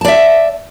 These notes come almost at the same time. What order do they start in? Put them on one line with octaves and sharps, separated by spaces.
A5 D5 E5